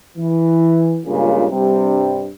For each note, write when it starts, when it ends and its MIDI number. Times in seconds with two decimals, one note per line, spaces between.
0.17 0.99 52
1.06 1.46 37
1.06 1.46 43
1.06 1.46 46
1.06 1.46 49
1.50 2.28 43
1.50 2.28 48
1.50 2.28 55